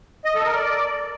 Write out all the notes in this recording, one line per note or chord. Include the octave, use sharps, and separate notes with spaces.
D#5
A4
A#4
D5